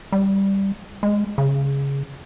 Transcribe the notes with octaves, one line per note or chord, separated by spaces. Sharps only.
G3
G#3
C#3